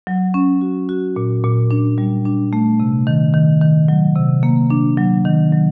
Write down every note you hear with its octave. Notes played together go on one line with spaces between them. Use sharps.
F#3
C#4
F#4
F#4
A#2
A#2
D4
G3
D4
A3
C3
D#3
D#3
D#3
F#3
C3
A#3
D4
F#3
D#3
F#3